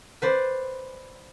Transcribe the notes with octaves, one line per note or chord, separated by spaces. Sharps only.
B4 C5 D5